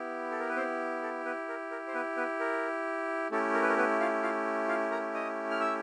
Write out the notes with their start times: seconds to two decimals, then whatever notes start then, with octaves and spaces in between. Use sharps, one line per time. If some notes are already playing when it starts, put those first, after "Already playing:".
Already playing: B3 E4 G4
0.31 A4
0.40 A#4
0.49 B4
0.56 C4 C5
1.03 A4
1.25 B3 B4
1.48 A#4
1.71 A#4
1.87 C5
1.94 B3 B4
2.17 B3 B4
2.40 A#4
3.31 A3 C#4 E4 G4 A4
3.54 A#4
3.62 B4
3.69 A#4
3.77 B3 B4
4.00 F4 F5
4.23 F4 F5
4.68 F4 F5
4.91 A#4 A#5
5.14 D#5 D#6
5.50 F6
5.60 E5 E6